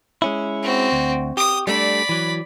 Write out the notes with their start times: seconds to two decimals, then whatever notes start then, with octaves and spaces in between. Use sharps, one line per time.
0.22 G#3 C#4 E4
0.63 C4 F#4
0.92 D2
1.37 G4 D#6
1.67 G3 A3 D4 D5 B5
2.09 E3 F#3